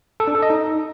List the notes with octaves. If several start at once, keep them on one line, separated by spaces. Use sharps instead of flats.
A4
D4
A4
D#5
D#4